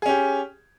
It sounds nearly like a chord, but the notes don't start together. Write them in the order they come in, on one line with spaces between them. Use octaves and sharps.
G#4 C#4 G4